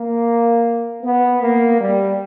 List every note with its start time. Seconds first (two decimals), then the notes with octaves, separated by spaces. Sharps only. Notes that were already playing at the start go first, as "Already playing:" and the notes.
Already playing: A#3
1.03 B3
1.42 A#3
1.79 G3